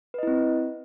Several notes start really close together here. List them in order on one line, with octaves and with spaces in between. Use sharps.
B4 D#5 E4 C4